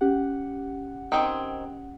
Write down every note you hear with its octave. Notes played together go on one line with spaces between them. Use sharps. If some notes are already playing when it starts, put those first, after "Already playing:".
C#4 G4 F#5
D#3 C4 G#4